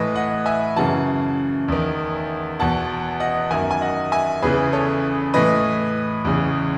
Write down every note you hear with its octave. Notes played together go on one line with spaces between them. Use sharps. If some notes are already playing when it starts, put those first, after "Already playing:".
Already playing: A2 E3 B4 D#5
D#5 F#5
E5 G#5
F#2 C#3 E3 F#5 A5
E2 D#3
E2 B2 F#5 A5
D#5 F#5
F#2 D#3 E5 G#5
G#5
D#5 F#5
E5 G#5
E2 C#3 E3 G#4 B4
A4 C#5
A2 E3 B4 D#5
E2 C#3 E3